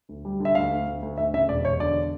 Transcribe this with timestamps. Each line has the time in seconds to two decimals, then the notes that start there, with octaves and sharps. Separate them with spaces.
0.09 D2
0.25 G3
0.40 D3 E5
0.55 D2 F5
0.71 D2
0.87 D2
1.02 D2
1.18 D2 E5
1.34 C#3 E5
1.49 E1 D5
1.65 E1 C#5
1.80 D3 D5